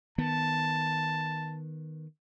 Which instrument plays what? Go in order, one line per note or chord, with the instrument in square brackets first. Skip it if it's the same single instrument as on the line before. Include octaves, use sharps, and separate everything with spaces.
[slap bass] D#3 B3 [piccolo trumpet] A5